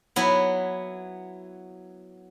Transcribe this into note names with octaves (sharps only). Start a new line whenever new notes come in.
F#3 B3 E4